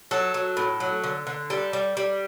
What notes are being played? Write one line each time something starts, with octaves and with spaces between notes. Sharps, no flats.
F#3 A4
F#3
A2
F#3
D3
D3
G3 A4
G3
G3